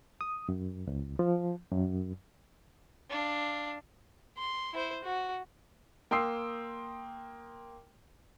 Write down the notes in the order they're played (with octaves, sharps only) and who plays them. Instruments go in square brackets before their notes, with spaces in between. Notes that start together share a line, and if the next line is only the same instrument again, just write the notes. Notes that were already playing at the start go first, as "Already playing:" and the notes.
[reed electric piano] D#6
F#2
C#2
F3
F#2
[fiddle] D4 F5
[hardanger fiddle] C6
E4 C5
F#4
[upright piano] A#3 G5 C6 D#6 E6 C7